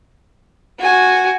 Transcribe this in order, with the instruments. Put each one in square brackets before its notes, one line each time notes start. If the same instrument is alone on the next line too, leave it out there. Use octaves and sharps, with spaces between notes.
[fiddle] F#4 G#5